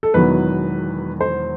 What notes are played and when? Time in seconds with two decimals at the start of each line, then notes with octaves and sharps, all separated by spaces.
0.03 A4
0.14 E1 E2 D#3 F#3 B4
1.21 C5